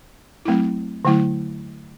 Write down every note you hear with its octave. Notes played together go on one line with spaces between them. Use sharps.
F#3 A3 C4 E4
D3 F#3 A3 E4